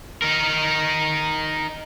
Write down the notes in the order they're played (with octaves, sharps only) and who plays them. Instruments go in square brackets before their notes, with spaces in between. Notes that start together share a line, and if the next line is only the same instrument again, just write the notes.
[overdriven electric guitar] D#4 A#4